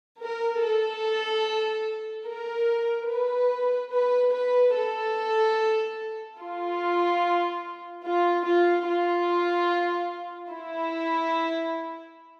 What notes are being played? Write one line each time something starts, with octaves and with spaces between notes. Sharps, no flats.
A#4
A4
A#4
B4
B4
B4
A4
F4
F4
F4
F4
E4